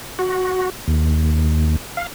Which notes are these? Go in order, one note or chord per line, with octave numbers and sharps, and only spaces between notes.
F#4
D#2
F5